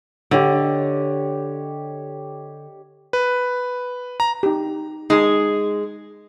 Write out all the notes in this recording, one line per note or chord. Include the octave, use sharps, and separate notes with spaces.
D3 G4 C#5 D#5
B4
A#5
D#4 G4
G#3 D#4 G#4